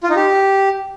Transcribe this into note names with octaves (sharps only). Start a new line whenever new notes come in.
F4
D#4
G4